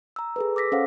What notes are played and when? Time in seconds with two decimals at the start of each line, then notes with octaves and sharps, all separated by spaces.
0.16 A#5 E6
0.36 G#4 A4 B4
0.56 D6 E6 A#6 B6
0.72 C#4 A4 C5 C#5 F5 F#5